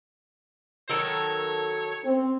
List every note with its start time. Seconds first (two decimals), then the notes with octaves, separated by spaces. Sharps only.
0.89 D#3 F#3 A4 C#5
2.06 C4